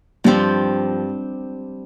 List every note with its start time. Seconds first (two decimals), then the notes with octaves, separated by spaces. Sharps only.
0.24 G2 F3 G3 C4 G4